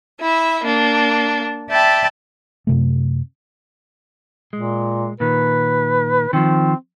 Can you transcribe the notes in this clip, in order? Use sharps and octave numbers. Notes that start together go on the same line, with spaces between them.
E4 E5
A#3 D4
D5 E5 G5 A5 B5
F#2 C3 A3
A#2 G#3
A#2 D#3 B4
D#3 F3 C4